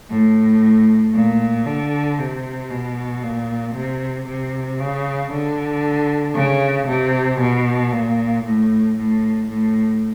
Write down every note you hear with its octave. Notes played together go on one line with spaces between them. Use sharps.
A2
A#2
D3
C3
B2
A#2
C3
C3
C#3
D3
C#3
C3
B2
A#2
A2
A2
A2